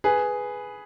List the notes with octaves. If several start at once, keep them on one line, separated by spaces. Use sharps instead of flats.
G#4 B4